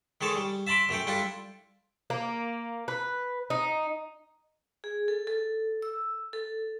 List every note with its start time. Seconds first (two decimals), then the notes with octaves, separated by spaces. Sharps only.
0.21 D#3 G#3 A4 C#5 A5
0.36 G3
0.67 E5 A5 B5 C6 D6
0.89 F#2 A3 A4 G5
1.07 G3 D4 E4 F4 G4 A4
2.10 A#3
2.88 B4
3.50 D#4
4.84 G#4
5.08 A4
5.27 A4
5.82 E6
6.33 A4